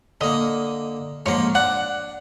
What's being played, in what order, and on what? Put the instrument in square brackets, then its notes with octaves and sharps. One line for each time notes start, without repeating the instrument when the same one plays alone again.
[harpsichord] D3 A#3 [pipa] D#5
[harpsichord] G#2 F3 A#3 [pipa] D3 C#5
[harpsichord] D4 [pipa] F#5